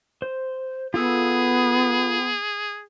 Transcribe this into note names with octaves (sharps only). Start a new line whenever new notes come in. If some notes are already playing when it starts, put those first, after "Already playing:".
C5
B3 F4 G#4 A4 E6